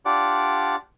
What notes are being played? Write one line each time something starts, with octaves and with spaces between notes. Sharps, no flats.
D4 F4 G4 D5 F#5 D6